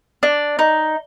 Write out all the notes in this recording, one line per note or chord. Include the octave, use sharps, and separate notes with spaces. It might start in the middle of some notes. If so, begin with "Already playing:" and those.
D4
D#4